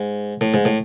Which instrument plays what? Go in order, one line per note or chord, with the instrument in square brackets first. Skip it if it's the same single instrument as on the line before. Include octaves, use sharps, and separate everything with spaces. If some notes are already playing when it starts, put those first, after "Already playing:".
Already playing: [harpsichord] G#2
A2
G#2
A2